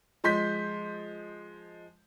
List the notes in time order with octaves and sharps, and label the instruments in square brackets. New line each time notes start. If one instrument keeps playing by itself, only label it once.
[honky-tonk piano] F3 G#3 C6 G6 B6